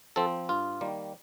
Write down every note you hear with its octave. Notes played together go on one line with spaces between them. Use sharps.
F3 C4 A4
G2 F4
D#3 G3 A#3